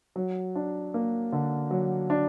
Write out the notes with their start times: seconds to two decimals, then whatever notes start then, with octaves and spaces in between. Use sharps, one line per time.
0.16 F#3
0.55 D4
0.94 A#3
1.32 D3
1.71 F#3
2.10 D4